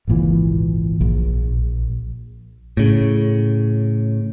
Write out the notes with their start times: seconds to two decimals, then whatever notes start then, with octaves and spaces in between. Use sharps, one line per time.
0.08 G#1 C#2 A#2 E3
1.01 A#1
2.77 A2 C#3